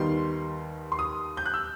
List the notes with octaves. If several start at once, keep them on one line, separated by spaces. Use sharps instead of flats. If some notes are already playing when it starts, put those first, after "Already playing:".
Already playing: D#2 D#3 G3 B3 D#4 C6
C6
D#6
G6
F#6
E6